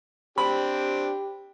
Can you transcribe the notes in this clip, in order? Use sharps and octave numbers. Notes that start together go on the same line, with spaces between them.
C4 D4 G4 B5